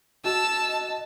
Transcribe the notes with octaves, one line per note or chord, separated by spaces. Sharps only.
F#4 D#5 A5 E6